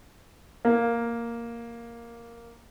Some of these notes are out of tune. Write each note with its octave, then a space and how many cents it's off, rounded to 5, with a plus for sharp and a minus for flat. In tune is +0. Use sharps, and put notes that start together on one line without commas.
A#3 +0